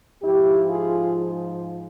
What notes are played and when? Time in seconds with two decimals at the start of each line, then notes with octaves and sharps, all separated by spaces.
0.22 G#2 F3 E4 G4
0.69 F4 G#4